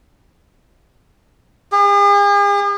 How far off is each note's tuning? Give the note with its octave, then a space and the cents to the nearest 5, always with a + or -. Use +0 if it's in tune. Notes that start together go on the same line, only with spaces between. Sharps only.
G#4 -45